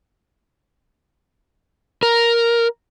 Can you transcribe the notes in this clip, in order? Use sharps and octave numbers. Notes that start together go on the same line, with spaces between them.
A#4